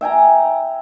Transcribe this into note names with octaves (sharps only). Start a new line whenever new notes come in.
E5 G5 G#5 A#5